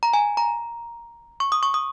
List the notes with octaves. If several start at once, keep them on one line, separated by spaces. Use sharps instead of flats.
A#5
G#5
A#5
C#6
D#6
C#6
D#6